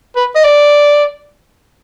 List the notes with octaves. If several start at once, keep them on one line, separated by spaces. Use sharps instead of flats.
B4
D#5
D5